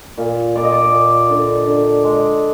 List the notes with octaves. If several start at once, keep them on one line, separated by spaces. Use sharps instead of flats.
A#2
A#2 D5
D#5
D5
A#2
D3
D3
G#3